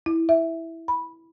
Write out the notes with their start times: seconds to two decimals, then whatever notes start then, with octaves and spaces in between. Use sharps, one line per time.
0.06 E4
0.29 E5
0.88 B5